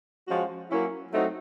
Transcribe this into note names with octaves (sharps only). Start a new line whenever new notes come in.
F3 G#3 C#4 F#4
F#3 A#3 C#4 E4
F#3 A3 C4 D#4 F#4